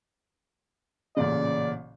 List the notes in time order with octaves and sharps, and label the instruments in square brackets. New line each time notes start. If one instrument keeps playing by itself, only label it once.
[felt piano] A1 A#2 C#3 [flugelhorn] D5